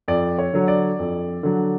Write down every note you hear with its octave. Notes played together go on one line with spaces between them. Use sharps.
F2 D5
C#5
D3 F#3
D5
F2
D3 F#3